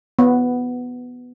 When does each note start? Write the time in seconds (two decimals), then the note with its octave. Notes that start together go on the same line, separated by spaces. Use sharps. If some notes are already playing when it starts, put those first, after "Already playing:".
0.19 B3